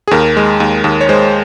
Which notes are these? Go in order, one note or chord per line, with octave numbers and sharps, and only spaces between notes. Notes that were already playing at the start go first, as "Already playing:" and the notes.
G#4
D#2 A#4
G#3
D#2
D#2
C#5
G#3 C5